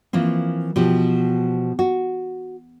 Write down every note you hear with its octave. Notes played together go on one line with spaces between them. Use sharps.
E3 F3 A#3 C4
B2 F3 G4
F#4